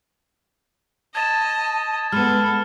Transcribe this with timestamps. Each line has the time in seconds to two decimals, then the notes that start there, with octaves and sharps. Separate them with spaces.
1.15 D#5 A5 G#6 A6 E7
2.12 G#3 B3 A4 B5 F6